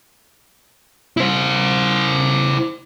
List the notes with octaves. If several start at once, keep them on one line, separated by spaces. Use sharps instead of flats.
E4 C5